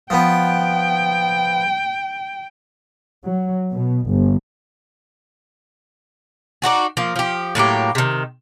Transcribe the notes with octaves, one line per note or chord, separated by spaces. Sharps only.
F3 B3 G5
F#3
B2
G1
D4 D#4 F#4 G#4
F3 A#3
F3 G4
A2 F#3 A#3 G4
C3 D#3